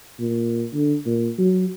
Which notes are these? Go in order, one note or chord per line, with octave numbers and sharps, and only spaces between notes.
A#2
D3
A#2
F#3